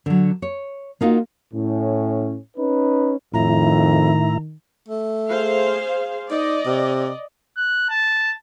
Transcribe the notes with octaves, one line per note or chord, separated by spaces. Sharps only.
D3 F#3
C#5
A#3 D#4 F4 F#4
A2 C#4
C#4 D#4 B4
F2 A2 D#3 E4 A#5
A3
G#4 C5 F5
D#4 D5 D#5
C3
F#6
A5